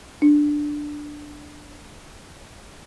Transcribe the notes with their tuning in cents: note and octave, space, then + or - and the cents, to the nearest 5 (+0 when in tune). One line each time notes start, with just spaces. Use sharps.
D4 +5